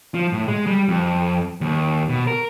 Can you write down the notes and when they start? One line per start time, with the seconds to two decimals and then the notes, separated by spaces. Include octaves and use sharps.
0.14 F3
0.33 A2
0.47 G#3
0.67 G3
0.88 F2
1.61 D#2
2.09 B2
2.27 A#4